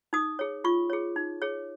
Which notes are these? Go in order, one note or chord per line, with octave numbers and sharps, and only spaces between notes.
D#4 D#6
G#4 C#5
F4 C#6
G#4 C#5
D#4
G#4 C#5